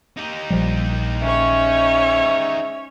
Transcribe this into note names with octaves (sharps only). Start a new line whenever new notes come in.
D#4 G4
A#1 F3 G3
G#2 C#4 C#5 E5